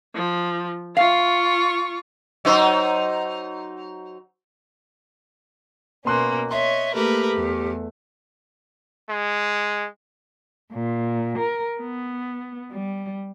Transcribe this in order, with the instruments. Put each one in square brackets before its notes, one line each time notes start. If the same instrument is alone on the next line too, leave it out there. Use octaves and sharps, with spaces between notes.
[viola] F3
[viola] F4 C#6 [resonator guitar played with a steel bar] F5
[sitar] F#3 D#4 C5
[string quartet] B2 A#3 C#4 [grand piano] B3 C6 F#6
[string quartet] C#5 D#5 [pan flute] E5 [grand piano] C6
[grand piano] A3 [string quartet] A#3 A#4 B4 [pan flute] G4
[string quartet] E2
[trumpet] G#3
[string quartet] A#2
A#4
B3
G3